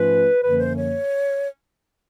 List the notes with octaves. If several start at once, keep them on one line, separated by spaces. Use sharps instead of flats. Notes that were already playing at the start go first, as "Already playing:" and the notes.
Already playing: G#2 F3 A3 C#4 F4 B4
F#2 D3 F3 A#3 B4
C5
C#5